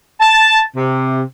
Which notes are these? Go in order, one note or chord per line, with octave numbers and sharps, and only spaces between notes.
A5
C3